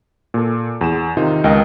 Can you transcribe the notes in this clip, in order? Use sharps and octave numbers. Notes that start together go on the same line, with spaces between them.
A#2 A4
E2 E7
C3 D#3 D#4 F4
C#2 A#4 D#5 G5